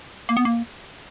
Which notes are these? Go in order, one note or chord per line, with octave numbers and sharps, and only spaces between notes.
A#3
B3
A#3